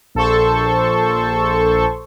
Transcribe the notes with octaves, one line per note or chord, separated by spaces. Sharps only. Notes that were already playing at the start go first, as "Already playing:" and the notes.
A#1 A4 C5 C#6